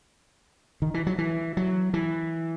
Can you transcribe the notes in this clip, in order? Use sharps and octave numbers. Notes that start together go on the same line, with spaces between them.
D#3
E3
F#3
E3
F#3
E3